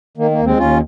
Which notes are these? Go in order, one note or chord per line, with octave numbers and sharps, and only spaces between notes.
D#3 A#3
A#3
D#2
G#3 C4
D#2 C#4 F4